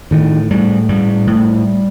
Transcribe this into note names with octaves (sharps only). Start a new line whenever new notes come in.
A2 D#3
A2 G3
A2 G3
A2